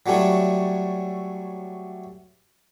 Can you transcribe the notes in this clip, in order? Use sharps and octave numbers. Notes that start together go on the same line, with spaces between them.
F#3 G3 A3 C#4 E4